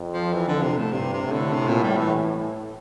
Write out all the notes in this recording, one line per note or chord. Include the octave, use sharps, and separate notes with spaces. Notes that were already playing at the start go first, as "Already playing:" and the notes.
Already playing: F2
F3
E3
D3
C3
A2
G2 C3
C3
A2
D3
C3
A#2
G3
E3